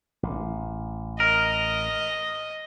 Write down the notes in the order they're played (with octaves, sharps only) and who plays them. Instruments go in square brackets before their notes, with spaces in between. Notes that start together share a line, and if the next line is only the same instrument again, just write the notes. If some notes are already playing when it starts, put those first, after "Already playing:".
[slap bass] A1
[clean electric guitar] A#4 [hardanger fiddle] D#5